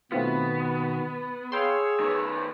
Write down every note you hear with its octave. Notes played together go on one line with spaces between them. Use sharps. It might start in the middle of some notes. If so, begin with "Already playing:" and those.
B2 D#3 A3 B3 C4 F4 F#4
G#4 C#5 F5 G5 C6 E6
D#3 B3